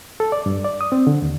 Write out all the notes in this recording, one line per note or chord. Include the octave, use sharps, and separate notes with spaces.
A4
D5
G2
D5
D#6
C4
D3
D#2